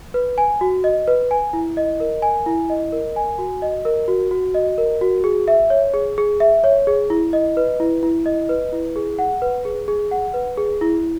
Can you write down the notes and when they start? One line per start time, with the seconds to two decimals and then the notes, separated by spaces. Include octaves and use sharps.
0.14 B4
0.38 G#5
0.61 F#4
0.84 D#5
1.08 B4
1.31 G#5
1.53 E4
1.77 D#5
2.00 A#4
2.22 G#5
2.46 E4
2.70 D#5
2.92 A#4
3.16 G#5
3.38 F#4
3.62 D#5
3.85 A#4
4.08 F#4
4.31 F#4
4.54 D#5
4.78 A#4
5.01 F#4
5.24 G#4
5.48 E5
5.70 C#5
5.94 G#4
6.18 G#4
6.40 E5
6.64 C#5
6.87 G#4
7.10 E4
7.33 D#5
7.57 B4
7.80 E4
8.03 E4
8.26 D#5
8.49 B4
8.73 E4
8.96 G#4
9.19 F#5
9.42 B4
9.65 G#4
9.88 G#4
10.11 F#5
10.34 B4
10.57 G#4
10.81 E4